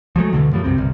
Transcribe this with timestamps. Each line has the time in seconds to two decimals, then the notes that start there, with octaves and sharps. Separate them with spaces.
0.16 F3 F#3 G#3 A3
0.33 D2 B2 D3 D#3
0.52 F#2 A2 F3 G3
0.64 C2 F#2 C3 C4
0.77 G1 C2